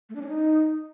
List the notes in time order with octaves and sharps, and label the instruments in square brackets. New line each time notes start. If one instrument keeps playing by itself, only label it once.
[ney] A3
D4
C#4
D#4